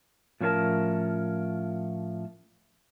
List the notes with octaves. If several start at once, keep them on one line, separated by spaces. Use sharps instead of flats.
A2 F3 C#4 A4 A#4 A5